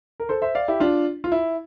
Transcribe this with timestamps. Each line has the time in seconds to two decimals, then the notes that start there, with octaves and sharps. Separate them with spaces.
0.20 A#4
0.29 A4 C5
0.42 C5 E5
0.55 D5 F5
0.68 E4 G4
0.80 D4 F4
1.24 F4
1.32 E4